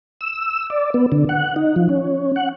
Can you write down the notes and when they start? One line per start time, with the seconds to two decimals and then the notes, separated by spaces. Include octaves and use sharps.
0.21 E6
0.70 D5
0.94 B3
1.12 D3
1.29 F#5
1.56 D#4
1.76 F3
1.89 C#4
2.36 F#5